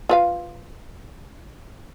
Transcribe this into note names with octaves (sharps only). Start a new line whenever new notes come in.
F4 B4 F5